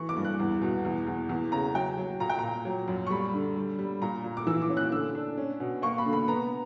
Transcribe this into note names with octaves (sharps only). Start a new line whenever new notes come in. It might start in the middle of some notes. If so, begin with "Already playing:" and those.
Already playing: E3 C#6
D6
G2
F#6
E2
B2
E2
E2
E2
C#3 A#5
F#3 G5
F#3
A#2 A#5
G5
A#2 A#5
F#3
F#2
C#6
G3 B5
D3
G3
G3
A#2 A#5
A#2
D6
E3 E6
D6
C#4
F#6
D3 E6
D4
C#4
B2
A#3 C#6
B5
D3
B5
B3 A#5